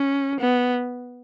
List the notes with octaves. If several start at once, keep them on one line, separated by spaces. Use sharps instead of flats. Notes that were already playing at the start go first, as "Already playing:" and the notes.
Already playing: C#4
B3